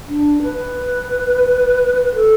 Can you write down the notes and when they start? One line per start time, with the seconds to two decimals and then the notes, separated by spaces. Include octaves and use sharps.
0.08 D4
0.42 B4
2.15 A4